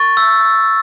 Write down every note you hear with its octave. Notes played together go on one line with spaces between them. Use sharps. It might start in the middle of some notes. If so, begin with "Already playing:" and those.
Already playing: C#6 A6
E6